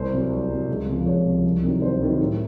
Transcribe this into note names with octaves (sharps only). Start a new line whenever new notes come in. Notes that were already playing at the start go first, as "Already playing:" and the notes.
Already playing: C2 C5
C3 F#3
C2
C3 F#3
C#2
C3 F3
C#2 C#5
C3 F3
C2
C3 D#3 F#3
C2 C5
C3 D#3 F#3
A2